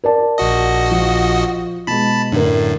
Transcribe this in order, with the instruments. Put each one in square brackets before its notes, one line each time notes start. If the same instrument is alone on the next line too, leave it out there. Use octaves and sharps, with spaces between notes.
[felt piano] A#4 D5 A5
[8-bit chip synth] A#1 F#4 D#5
[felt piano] F3
[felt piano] B2 G#3 [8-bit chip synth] A5 B5
[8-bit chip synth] F#2 A2 [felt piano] D3 A#4